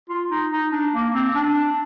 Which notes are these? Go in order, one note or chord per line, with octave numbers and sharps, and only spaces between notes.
F4
D#4
D#4
D4
A#3
C4
D4